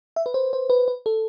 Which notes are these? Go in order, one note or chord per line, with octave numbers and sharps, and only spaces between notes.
E5
B4
C5
C5
B4
B4
A4